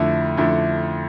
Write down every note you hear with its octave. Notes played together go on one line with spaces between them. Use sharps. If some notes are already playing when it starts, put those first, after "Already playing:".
Already playing: F2 D3 A3 E4
F2 D3 A3 E4